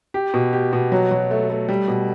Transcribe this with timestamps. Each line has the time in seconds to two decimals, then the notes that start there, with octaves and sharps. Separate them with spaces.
0.14 G4
0.34 B2
0.53 G4
0.73 B2
0.92 F#3
1.11 F#3
1.31 A3
1.50 A3
1.69 G3
1.88 B2